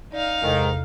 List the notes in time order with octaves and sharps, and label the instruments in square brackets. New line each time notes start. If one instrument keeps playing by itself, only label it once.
[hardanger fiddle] D#4 F5 [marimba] D5
[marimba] E2 C3 A4 [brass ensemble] G#2 D#3